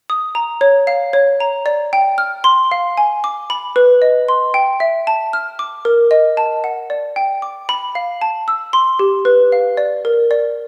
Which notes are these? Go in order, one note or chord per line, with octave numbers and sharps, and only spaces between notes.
D#6
A#5
C#5
F5
C#5
A#5
D5
G5
F6
C6
F5
G#5
D6
B5
B4
D#5
C6
G5
E5
A5
F6
D6
A#4
D#5
A5
F#5
D5
G5
D6
B5
F5
A5
E6
C6
G4
B4
F5
D5
A#4
D5